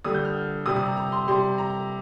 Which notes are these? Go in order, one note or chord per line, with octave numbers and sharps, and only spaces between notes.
D3 G3 D#6
G6
F6
C3 G3 D#6
D#6
A#5
A#5
C6
C3 G3 C6
A#5